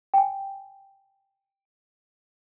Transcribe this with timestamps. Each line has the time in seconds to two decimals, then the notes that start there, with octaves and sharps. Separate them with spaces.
0.14 G5 G#5